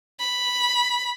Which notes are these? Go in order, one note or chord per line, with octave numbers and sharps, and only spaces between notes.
B5